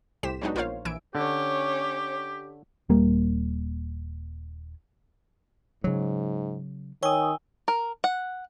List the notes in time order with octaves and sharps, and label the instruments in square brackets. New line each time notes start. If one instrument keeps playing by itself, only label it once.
[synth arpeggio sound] C2 A2 G4 C5 B6 E7
F#3 G#3 B3 D4 D#4 F#4
A#1 F4 A#4 C5 C#5 F5
A#1 E3 E4 G#5 E6 D7
[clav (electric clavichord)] D3 [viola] C#4 C#5 [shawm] G4
[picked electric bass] D#1 G3 A#3
[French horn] G#2 [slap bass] C#3 F#3
[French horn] D#3 [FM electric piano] C#5 D#6 [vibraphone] G5 G#5 E6
[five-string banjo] A#4
F#5